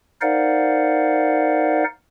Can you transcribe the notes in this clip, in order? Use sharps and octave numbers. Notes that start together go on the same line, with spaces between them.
D#4 A#4 C5 D5 F5 F#5